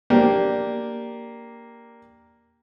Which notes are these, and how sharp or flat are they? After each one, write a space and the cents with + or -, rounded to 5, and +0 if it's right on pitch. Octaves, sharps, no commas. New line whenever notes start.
A#3 +0 D4 +0 G4 -5